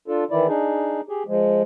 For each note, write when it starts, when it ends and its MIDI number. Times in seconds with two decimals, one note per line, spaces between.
0.08 0.24 62
0.08 0.24 65
0.08 0.24 69
0.31 0.47 51
0.31 0.47 52
0.31 0.47 64
0.31 0.47 74
0.47 1.01 62
0.47 1.01 63
0.47 1.01 68
1.09 1.23 67
1.09 1.23 68
1.27 1.62 53
1.27 1.62 56